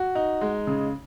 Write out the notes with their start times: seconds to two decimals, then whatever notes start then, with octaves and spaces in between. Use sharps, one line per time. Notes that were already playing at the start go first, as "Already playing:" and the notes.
Already playing: F#4
0.15 D#4
0.41 G#3
0.67 C#3